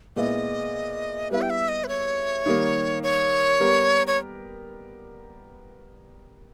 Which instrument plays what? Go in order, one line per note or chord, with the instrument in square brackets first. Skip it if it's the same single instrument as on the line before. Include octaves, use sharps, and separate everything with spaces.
[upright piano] A#2 G#3 B3 E4 [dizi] D#5
[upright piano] G3 B3 E4 [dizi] B4
[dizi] G5
E5
D#5
B4
C#5
[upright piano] D#3 G3 A#3
[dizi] C#5
[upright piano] G3 B3 G4 A#4
[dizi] C#5